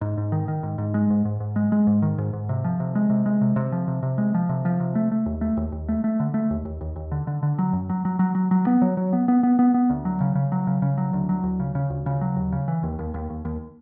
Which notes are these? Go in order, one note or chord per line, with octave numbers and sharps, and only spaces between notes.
G#2
G#2
D#3
D#3
G#2
G#2
G#3
G#2
G#2
G#2
G#3
G#3
G#2
D#3
G#2
G#2
C3
F3
C3
G#3
C3
G#3
C3
C3
F3
C3
C3
G#3
F3
C3
F3
C3
A3
A3
D#2
A3
D#2
D#2
A3
A3
D3
A3
D#2
D#2
D#2
D#2
D3
D3
D3
F#3
F#2
F#3
F#3
F#3
F#3
F#3
B3
F#3
F#3
B3
B3
B3
B3
B3
D2
F#3
C#3
C#3
F#3
C#3
C#3
F#3
D2
F#3
D2
C#3
C#3
D2
C#3
F#3
D#2
C#3
E3
D#2
D#2
D#2
D#2
D#2